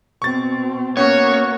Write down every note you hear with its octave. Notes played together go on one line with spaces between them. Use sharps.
B2 C4 C#6 A6
A#3 B3 C#4 F#4 C#5